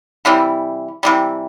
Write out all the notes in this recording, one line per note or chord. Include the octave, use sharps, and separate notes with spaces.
C3 E3 G3
C3 E3 G3